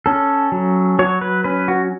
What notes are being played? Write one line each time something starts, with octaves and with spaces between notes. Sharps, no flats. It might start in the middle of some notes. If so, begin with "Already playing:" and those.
C#4 A4
F#3
F#3 C#5
B4
C#4 B4
F#4